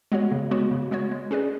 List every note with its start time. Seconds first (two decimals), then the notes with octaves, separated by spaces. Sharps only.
0.12 G#3 B3 F#4 C#5
0.32 C#3
0.51 G#3 B3 F#4 C#5
0.71 C#3
0.91 G#3 B3 F#4 C#5
1.11 G#3
1.31 C#4 G#4 B4 D5